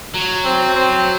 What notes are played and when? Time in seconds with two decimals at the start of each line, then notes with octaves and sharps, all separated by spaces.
0.15 F#3
0.45 C4
0.75 C4